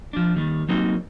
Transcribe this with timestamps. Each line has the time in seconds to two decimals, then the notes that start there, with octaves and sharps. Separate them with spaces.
0.13 F3 D4
0.35 D#2 D#3 G3
0.69 F#3 G3 A#3 C4 D#4